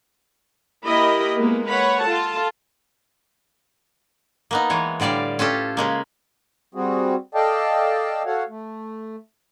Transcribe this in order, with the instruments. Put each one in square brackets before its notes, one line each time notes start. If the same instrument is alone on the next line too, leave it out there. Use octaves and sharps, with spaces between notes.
[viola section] A#3 E4 G4 A#4 D#5 B5
G#3 A#3 B3
B4 C#5 F#5 B5
F4 A4 A5
[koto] A#3 B3 D#4
E3 G#3 C#5
A2 D3 G3 D5 F5
C#4 F4 G4 A4
C#3 G#3 A#3
[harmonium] G3 C4 F#4 G#4
A4 D5 D#5 F5 G5 A5
F#4 A4 C#5 F5 F#5
A3